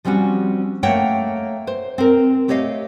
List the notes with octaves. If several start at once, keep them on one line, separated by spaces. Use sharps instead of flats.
F3 G3 C4 C#4 F#4
A3 A#3 C#5 F#5 G5
C5
C4 A#4
A3 G4 C#5 D#5 F5